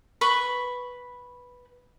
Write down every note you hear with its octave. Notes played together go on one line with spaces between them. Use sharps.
B4 B5 C#6